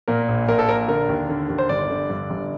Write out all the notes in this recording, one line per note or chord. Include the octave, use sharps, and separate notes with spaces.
A#2 A#4
A#1
A#2 A#4
A4
A#1 A#4
D3 A#4
D#2
D3
D#2
C5
G1 D5
D3
G2
G1